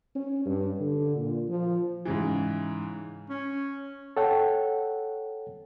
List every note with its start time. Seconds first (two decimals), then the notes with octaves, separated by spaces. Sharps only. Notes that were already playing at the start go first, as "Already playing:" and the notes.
0.15 C#4
0.45 G2
0.80 D3
1.16 A#2
1.48 F3
2.05 G#2 C#3 E3
3.30 C#4
4.17 A4 C#5 F#5 G5